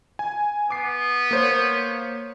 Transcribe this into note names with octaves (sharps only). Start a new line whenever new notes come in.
G#5
B3 D6 C7
A#3 C5 C#5